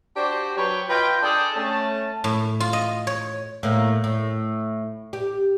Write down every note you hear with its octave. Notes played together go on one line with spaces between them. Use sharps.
D4 F#4 G4 C5
F#3 B4 C#5 G5
F4 B4 D#5 G5
D4 G#4 A4 G5 A5
A3 C#4 A5
A2
F4
D#5
C#5
A2 A#3
A2
G4